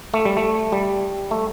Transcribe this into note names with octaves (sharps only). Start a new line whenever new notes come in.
A3
G3
A3
G3
A3